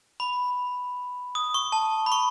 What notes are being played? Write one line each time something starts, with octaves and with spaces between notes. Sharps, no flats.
B5
D#6
C#6
A5
B5
C#6